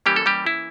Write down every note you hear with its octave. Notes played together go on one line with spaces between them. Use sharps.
E3 G3 A#3 C#4 G4
A4
G3 G4
E4